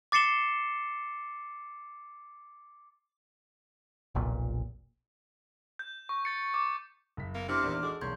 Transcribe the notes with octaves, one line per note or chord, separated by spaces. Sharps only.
D6 A6 C7 C#7 E7 G7
F1 B1 A#2
G6
C#6
A6 C#7
D6
F#1 B6
A#3 B3
C3 D4 E4 C6 D6 F6
E2 A#2 D#3
G#3 F#4 G#4 A4
B1 E2 A#3 C#4 C6 G6 G#6